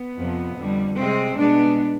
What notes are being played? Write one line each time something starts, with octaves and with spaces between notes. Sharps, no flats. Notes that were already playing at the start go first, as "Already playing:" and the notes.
Already playing: B3
F2 C3 F3
F2 D3 G3
C3 G3 G#3 C4
B2 G#3 B3 D4